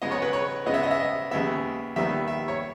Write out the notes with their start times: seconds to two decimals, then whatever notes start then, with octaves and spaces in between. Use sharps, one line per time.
0.02 C#2 C#3 G#3 B3 D#5
0.11 C#5
0.22 B4
0.33 C#5
0.66 C#2 C#3 G#3 B3 D#5
0.74 E5
0.83 D#5
0.91 E5
1.00 D#5
1.31 D#2 C#3 G#3 B3 E5
1.96 D#2 D#3 G3 B3 E5
2.28 E5
2.48 C#5